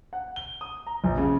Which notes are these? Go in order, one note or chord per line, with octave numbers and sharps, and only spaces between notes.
F#5
G7
D#6
A#5
A#1
C#3